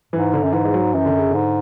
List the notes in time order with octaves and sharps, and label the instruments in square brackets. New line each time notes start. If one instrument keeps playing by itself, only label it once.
[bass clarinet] G#2 [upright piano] E3
[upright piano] D3
[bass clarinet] F#2
[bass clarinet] G#2 [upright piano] E3
[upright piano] G#3
F#3
[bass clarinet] F#2 [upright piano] E3
[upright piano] D3
C#3
[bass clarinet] G#2 [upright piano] D3